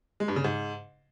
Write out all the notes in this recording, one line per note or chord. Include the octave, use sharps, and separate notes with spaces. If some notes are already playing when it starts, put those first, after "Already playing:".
G#3
G2
C#3
G#2